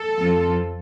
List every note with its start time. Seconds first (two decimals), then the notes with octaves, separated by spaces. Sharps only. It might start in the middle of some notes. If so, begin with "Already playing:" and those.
Already playing: A4
0.16 F2 F3 C4 F4